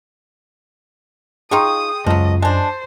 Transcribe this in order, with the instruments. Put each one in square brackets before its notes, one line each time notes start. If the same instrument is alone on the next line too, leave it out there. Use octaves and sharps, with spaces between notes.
[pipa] D#4 F4 C#6 [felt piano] G#4 G5 C6 [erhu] D#6
[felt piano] C#2 [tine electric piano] F#2 [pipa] F3 F#3 [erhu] D#5
[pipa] G#3 D4 [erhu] C5 [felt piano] A5